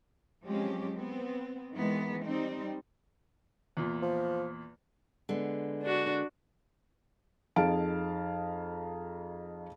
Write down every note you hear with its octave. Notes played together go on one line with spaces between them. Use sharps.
F3 F#3 G#3 C4 C#4 G4
B3 C4
D#3 E3 G#3 B3
G3 C4 D#4
E2 A#2
F3
D3 G#3 B3
D4 F#4
F2 D#4 G#4 F5 A5 D7